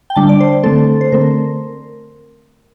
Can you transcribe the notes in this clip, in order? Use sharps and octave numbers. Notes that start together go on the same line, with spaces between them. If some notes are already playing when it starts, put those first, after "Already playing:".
G5
D3 G3 D4 A5
D5
C5
D3 A3 C4 A4
C5
D3 A3 C4 A#4